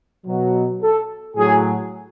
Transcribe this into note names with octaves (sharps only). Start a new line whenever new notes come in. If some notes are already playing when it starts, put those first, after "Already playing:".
B2 F#3
A4
A2 F#3 G#4